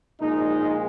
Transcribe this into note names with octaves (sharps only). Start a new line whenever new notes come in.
A#1 A#2 G#3 D#4